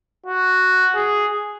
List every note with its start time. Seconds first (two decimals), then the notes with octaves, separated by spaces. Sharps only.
0.26 F#4
0.95 G#4